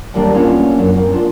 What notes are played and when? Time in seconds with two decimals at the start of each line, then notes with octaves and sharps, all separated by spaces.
0.14 D#2 G3 A#3 D4
0.34 A#3 B3 C#4 D4 E4 F4
0.79 F#2
0.93 A#3 C4
1.13 D4 F4